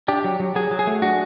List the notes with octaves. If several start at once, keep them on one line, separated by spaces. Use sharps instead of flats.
D4 G4
F#3
F#3
F#3 G#4
F#3
G#4
A3
D4 F#4